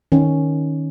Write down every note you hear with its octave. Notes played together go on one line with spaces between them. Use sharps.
D#3 C#4